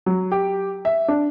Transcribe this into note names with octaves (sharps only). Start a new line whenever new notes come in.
F#3
G4
E5
D4